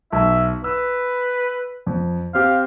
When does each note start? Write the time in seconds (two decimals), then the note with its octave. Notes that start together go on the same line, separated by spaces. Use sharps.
0.13 B1 E5
0.64 B4 E6
1.87 F2
2.35 C4 G4 F5